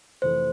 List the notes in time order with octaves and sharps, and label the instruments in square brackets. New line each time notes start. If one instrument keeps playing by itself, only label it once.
[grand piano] F2 C3 E3 A3 [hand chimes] C5